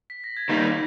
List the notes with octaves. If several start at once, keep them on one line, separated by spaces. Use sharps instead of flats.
B6
A#6
G#6
D#3 G3 A#3 D#4 G6